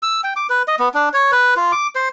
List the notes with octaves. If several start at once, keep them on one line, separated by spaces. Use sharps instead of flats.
E6
G5
D6
B4
D#5
B3
D4
C#5
B4
F4
D6
C5